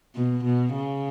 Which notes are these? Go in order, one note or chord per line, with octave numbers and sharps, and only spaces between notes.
B2
B2
C#3